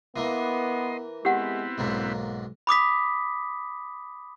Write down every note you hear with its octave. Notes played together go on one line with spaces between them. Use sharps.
E3 A#3 B3 D#5 C6
G#3 B3 C4 E4 G4 F#5
B1 G#2 F#3 A#3
B5 D6 D#6 B6